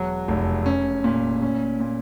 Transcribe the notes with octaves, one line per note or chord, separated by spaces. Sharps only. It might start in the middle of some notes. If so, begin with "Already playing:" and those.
Already playing: E1 F#3
F1
C#4
A#2
C#4
A#2